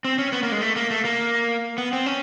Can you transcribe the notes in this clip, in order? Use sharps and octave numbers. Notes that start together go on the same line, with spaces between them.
C4
C#4
B3
A#3
G#3
A3
A#3
A3
A#3
B3
C4
C#4